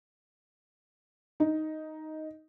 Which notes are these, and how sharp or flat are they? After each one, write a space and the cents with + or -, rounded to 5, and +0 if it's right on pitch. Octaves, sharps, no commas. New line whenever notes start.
D#4 +5